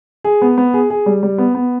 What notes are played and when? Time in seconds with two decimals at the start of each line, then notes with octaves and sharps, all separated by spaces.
0.24 G#4
0.42 B3
0.58 B3
0.74 G#4
0.90 G#4
1.06 G3
1.23 G3
1.38 B3
1.55 B3